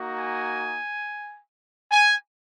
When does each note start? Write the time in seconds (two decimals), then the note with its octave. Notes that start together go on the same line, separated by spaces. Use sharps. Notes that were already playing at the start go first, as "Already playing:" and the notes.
Already playing: A#3 D#4 F#4
0.19 G#5
1.92 G#5